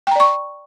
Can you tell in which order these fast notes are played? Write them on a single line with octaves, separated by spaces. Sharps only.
G5 A#5 D5 C#6